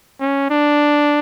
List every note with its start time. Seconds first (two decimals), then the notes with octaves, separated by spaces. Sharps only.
0.20 C#4
0.51 D4